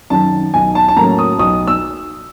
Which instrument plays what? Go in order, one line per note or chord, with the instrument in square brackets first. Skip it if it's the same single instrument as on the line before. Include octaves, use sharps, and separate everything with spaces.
[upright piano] F#2 D#3 A5
B1 G#5
A5
A5
A2 F#3 A#3 C#4 A#5
D#6
B1 D#6
E6